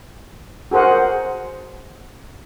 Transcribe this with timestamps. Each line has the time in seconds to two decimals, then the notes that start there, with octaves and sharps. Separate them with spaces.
0.71 F#4 G#4 A#4 C5 F#5